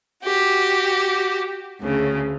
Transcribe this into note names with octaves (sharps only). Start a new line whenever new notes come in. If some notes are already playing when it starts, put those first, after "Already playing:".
F#4 G4
D2 C#3